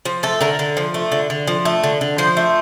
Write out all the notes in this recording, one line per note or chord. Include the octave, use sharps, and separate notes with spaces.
F3
A3 A4
D3 A#4
D3
F3
A3
D3
D3
F3
A3
D3
D3
F3 C5
A3